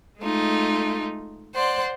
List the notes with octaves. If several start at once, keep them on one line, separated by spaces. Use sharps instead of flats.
G#3 A3 D#4 F4
C5 D5 F#5 C6